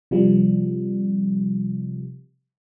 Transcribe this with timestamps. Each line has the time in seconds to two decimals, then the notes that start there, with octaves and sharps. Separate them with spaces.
0.11 C3 F3 G3